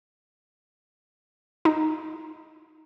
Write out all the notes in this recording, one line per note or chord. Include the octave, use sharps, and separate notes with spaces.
D#4